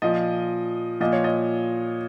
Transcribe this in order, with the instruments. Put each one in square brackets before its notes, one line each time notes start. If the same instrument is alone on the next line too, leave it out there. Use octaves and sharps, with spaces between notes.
[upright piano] A#2 F3 D#5
A#2 F3 D#5
C#5
D#5